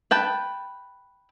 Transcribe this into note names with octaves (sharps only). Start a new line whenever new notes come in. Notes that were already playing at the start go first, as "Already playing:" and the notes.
B4 G5 A5